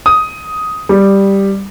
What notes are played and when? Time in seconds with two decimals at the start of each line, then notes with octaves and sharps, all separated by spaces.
0.06 D#6
0.89 G3